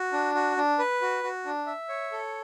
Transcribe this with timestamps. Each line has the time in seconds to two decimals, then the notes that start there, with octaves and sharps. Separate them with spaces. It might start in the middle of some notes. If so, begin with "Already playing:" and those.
Already playing: F#4
0.13 D4
0.35 F#4
0.57 D4
0.79 B4
1.02 F#4
1.23 F#4
1.46 D4
1.67 E5
1.89 C#5
2.12 A4